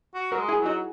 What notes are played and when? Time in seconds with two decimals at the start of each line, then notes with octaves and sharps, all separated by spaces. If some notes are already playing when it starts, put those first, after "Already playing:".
0.15 F#4
0.32 F#3 F#4 A#4
0.38 G#3
0.48 E4 G#4
0.60 F#3
0.66 D#4 F#4